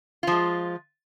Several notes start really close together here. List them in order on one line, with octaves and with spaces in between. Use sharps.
F4 F3 G#3